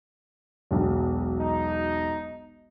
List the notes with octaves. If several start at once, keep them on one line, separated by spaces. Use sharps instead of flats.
E1 B1
D#4